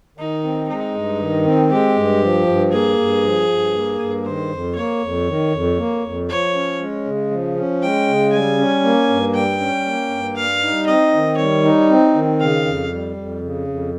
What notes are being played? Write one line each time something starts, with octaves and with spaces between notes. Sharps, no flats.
D#3 D#4
C4
G#3 D#4
G2
D#3
C4
G#3 G4
G2
F3
G2
A#3 G#4
G2
F3
G2
A#3
G2
D#3 C5
F2
A#3 C#5
F2
D#3
F2
A#3
F2
F3 C#5
C#4
G#3
C#3
F3
C#4
G#3 G5
C#3
G3 G#5
C#4
A#3
G2
G3 G5
C#4
A#3
G2
G3 F5
D#4
C4 D#5
D#3
G3 C#5
D#4
C4
D#3
C#3 F5
F2
G3
F2
C#3
F2